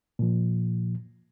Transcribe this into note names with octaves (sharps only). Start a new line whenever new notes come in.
A#2 F3